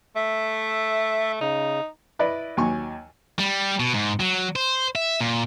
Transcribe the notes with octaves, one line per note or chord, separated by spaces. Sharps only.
A3 E5
C#3 D#4
E4 B4 D5 D#5
D#2 F#3 G#5 C#6
G3
B2
G#2
F#3
C5
E5
A#2